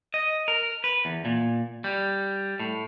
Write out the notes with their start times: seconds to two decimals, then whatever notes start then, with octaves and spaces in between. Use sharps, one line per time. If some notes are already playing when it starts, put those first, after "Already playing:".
0.14 D#5
0.48 A#4
0.84 B4
1.05 E2
1.25 A#2
1.84 G3
2.60 A2